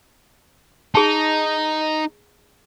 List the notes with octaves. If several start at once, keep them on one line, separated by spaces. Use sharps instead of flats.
D#4 G#4 A5